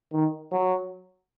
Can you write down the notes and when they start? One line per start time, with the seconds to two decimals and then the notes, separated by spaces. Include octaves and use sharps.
0.13 D#3
0.52 F#3